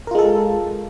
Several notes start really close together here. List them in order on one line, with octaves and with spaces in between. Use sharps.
A#4 F4 G#3 A4